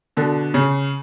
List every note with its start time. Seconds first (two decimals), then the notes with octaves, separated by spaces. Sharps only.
0.17 B2 D3
0.54 C#3